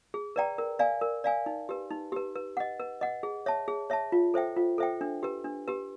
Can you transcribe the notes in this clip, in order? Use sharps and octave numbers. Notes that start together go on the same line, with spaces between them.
G#4
B4 D5 G5 A#5
A#4
D5 F5 G#5
A#4
D5 F5 G#5
D#4
G4 B4
D#4
G4 B4
B4
D#5 F#5
B4
D#5 F#5
G#4
C#5 E5 A5
G#4
C#5 E5 A5
F4
A4 C5 E5 G5
F4
A4 C5 E5 G5
D4
G4 B4
D4
G4 B4